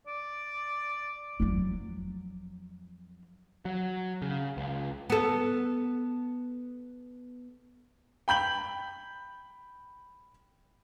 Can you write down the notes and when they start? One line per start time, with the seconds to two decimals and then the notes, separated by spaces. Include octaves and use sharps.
0.07 D5
1.40 F2 F#3
3.65 F#3
4.22 C#3
4.57 C#2
5.10 B3 A4
8.28 G5 B5 G6 F#7